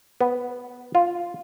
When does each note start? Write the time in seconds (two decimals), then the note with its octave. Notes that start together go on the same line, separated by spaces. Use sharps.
0.21 B3
0.95 F4